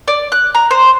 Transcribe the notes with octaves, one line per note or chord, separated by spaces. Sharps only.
D5
F#6
A#5
C5